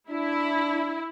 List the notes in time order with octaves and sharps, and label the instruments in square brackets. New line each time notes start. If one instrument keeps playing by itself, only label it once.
[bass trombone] D4 [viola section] E4